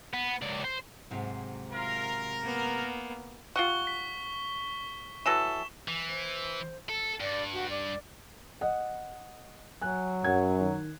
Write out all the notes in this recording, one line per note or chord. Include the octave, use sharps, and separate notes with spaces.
B3
C#2 D5
C5
G#2 C3 F#3
F4 A#4
A#3 B3
F4 G4 F#5 C#6 G7
B6
E3 F#3 A4 E7
E3
C5
A4
G2 D5
F#4
D5
D#5 F#5
F#3 G#5 F#6
F#2 F#5 G#6
D#3